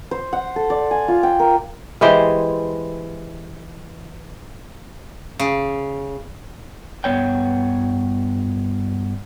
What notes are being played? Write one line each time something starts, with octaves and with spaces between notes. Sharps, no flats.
C5
F#5
A4
D5
G#5
F4
G5
A#4
E3 G#3 G4 C5
C#3
G2 B3 C#5 G5